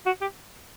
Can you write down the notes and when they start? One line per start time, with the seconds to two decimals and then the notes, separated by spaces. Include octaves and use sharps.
0.06 F#4
0.21 G4